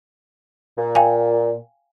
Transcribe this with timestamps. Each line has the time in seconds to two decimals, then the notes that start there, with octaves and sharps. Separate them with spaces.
0.78 A#2
0.95 F5 G5 G#5